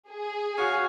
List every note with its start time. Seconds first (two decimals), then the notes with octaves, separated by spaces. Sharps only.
0.11 G#4
0.58 F#4 C#5 F5 G#5